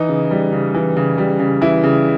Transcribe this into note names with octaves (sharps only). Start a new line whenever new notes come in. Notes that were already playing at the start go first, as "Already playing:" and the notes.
Already playing: E3 D#4
C#3
G3
C#3
E3
C#3
G3
C#3
E3 E4
C#3